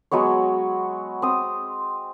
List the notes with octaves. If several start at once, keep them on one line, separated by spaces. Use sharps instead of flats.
F#3 G#3 B3 C#5
C4 D#6